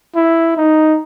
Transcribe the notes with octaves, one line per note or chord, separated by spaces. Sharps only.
E4
D#4